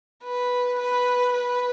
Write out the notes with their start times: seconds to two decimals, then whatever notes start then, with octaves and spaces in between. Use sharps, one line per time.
0.23 B4
0.79 B4
1.34 B4